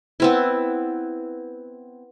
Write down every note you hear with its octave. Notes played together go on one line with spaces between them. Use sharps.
B3 C4 E4